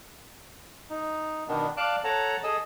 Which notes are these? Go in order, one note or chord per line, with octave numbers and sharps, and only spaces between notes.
D#4
B2 D#3 B3 D4
D5 F5 A5 D6 F#6
A4 C#5 F#5 A5 A#5
G#4 A4 D#5 E6